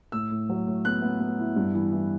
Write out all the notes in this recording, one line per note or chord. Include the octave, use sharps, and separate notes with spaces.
A2 E6
A2
F#3
A2
B3 F#6
B3
B3
E4
G2
E3
E3